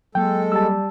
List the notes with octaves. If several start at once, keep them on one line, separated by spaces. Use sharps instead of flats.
F#3 G#3 A#3 A4 G5
G3 A5 E6